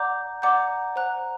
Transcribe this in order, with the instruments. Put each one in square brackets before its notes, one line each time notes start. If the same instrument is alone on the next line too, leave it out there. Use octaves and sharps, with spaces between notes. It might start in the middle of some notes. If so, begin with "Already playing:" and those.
Already playing: [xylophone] D5 F#5 A#5 D6 G6
D5 F#5 A#5 D6 G6
C5 F#5 A#5 F#6